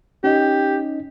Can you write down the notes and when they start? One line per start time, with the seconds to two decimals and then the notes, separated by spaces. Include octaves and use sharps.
0.24 C#4 D#4 G4 D#5